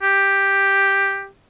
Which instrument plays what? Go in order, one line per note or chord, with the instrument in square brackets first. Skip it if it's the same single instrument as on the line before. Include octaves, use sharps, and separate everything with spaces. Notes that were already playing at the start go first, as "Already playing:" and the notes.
[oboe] G4